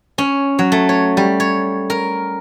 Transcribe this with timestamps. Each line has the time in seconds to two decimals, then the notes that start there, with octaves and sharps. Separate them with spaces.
0.18 C#4
0.59 F#3
0.72 A3
0.89 C#5
1.17 G3
1.40 C#5
1.90 A#4